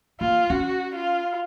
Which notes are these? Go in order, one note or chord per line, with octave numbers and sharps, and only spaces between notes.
A#3 F4
C#4 F#4
F4